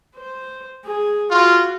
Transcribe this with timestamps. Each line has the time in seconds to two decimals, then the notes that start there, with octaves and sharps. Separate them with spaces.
0.16 C5
0.84 G#4 G#5
1.30 F4 F#4